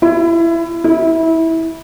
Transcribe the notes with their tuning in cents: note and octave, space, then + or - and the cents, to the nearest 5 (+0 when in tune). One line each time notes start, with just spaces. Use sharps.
E4 +25
E4 -20